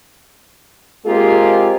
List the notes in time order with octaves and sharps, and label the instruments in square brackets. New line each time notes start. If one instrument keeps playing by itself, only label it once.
[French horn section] G#3 A#3 C4 F4 G4 G#4